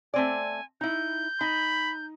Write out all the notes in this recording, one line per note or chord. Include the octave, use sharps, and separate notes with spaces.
A3 C4 D5 G#5
D#4 E4 G6
D#4 B5